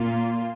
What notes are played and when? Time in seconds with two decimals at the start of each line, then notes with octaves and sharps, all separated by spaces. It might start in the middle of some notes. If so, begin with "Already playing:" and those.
Already playing: A#2 A#3 F4